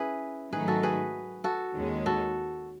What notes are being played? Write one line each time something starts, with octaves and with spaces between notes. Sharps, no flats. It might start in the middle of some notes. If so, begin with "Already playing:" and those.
Already playing: C#4 E4 G#4 B4
G#2 D#3 F#3 A3 D#4 G#4 B4
F#4 A4
G#4 B4
F#4 A4
D#2 D#3 G#3 C#4
F#4 A4